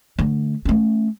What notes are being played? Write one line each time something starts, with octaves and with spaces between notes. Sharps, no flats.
D3 A3
A3 C#4